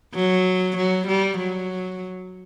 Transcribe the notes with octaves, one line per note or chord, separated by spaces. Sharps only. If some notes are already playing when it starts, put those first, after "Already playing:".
F#3
F#3
G3
F#3